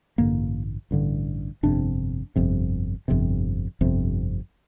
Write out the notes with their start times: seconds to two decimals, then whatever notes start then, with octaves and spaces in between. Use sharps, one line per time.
0.18 A1 G2 D3 A#3
0.91 A1 G2 D3
1.63 G1 F2 C3 D4
2.36 G1 F2 C3
3.08 G1 F2 C3
3.81 G1 F2 C3